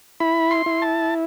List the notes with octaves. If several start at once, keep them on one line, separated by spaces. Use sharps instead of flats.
E4 B5
C6
E4
A5